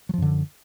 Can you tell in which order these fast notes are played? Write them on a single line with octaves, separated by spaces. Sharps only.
F#3 F3 F#2 D3